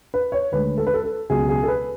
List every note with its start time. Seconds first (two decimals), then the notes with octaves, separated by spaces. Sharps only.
0.14 B4
0.32 C#5
0.52 D2 D3 G#3 B4
0.78 A4
0.87 B4
0.94 A4
1.04 A4
1.30 C#2 B2 F#3 G#4
1.49 G#4
1.63 A4
1.68 B4